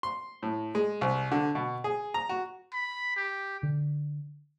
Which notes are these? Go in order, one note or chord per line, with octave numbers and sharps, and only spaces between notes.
C6
A2
G#3
C2
D3
B2
G#4
A#5
F#4
B5
G4
D3